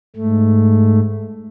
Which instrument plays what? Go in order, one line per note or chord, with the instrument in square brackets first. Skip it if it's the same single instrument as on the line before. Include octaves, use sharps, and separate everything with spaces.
[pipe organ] G#2 A3